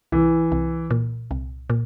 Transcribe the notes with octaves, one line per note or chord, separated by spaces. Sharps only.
C2 E3
C2
A#2
C2
A#2